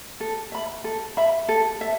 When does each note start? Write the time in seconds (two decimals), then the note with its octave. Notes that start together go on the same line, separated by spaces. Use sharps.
0.20 A4
0.52 E5 B5
0.84 A4
1.17 E5 B5
1.49 A4
1.81 E5